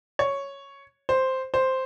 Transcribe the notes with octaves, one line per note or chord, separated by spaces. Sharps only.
C#5
C5
C5